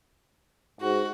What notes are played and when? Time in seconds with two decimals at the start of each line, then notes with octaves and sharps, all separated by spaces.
0.81 G#2 F#4